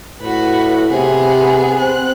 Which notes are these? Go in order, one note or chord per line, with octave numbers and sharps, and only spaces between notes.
A2 F#4 B4
C3 B3 G#4
C4 F#6